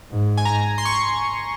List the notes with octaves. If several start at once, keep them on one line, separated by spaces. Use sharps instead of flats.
G#2
G#5
A#5
C6
C#6
C6